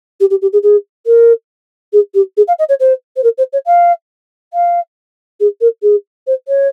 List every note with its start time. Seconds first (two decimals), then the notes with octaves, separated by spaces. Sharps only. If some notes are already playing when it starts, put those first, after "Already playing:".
0.20 G4
0.30 G4
0.42 G4
0.52 G#4
0.63 G#4
1.06 A#4
1.93 G#4
2.14 G4
2.37 G#4
2.47 F5
2.58 D#5
2.69 C#5
2.80 C5
3.16 C5
3.23 A#4
3.38 C5
3.52 C#5
3.66 F5
4.53 F5
5.40 G#4
5.61 A#4
5.82 G#4
6.27 C5
6.48 C#5